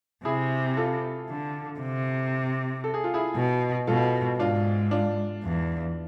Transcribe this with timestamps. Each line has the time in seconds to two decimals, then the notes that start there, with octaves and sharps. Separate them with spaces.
0.24 C3 E4 G#4
0.77 F4 A4
1.29 D3
1.80 C3
2.84 A4
2.94 G#4
3.04 F4
3.14 E4 G#4
3.36 B2
3.87 B2 F4 A4
4.39 G#2 D4 F4
4.91 D4 F4
5.43 E2